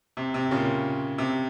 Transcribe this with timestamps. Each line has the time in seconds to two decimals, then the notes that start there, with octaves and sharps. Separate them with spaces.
0.17 C3
0.34 C3
0.51 A#2 C#3
1.18 C3